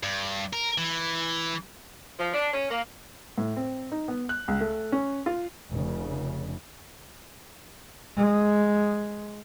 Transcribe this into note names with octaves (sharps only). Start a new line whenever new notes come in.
G2
A#4
E3
F3
D4
C#4
A#3
A2
C4
D#4
B3
F#6
C#2
A3
C#4
F4
F1 C#3
G#3